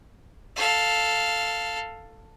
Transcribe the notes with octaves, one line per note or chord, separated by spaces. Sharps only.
A4 F5